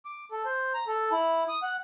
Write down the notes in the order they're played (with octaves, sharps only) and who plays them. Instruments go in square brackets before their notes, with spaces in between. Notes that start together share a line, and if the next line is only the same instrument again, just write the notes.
[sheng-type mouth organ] D6
A4
C5
A#5
A4
E4
D#6
F#5